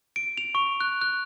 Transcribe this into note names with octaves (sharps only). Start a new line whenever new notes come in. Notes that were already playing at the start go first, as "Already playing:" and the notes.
D7
F7
C#6
F#6
F#6